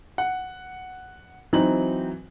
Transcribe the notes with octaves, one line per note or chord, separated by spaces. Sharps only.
F#5
E3 F#3 C4 D#4 F#7